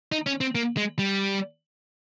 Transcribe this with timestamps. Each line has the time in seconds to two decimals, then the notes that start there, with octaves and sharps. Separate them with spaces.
0.12 D#4
0.26 C#4
0.41 C4
0.55 A#3
0.77 G#3
0.99 G3